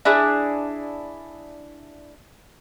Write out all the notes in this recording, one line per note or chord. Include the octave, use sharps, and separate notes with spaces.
D4 E4 G#4